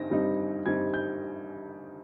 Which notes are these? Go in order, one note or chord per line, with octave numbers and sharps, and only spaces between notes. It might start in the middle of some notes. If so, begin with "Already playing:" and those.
Already playing: G2 G3 C4 D#4 A#6
G2 G3 C4 D#4
G2 G3 C4 D#4 G#6
G6